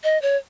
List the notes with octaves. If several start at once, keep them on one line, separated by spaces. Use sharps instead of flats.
D#5
C#5